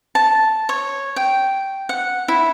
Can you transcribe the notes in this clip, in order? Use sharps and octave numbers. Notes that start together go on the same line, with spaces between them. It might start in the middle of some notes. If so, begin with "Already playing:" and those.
A5
C#5
G5
F#5
E4